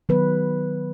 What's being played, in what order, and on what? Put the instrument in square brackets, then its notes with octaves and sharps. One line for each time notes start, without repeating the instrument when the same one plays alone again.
[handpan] D#3 F#3 B3 B4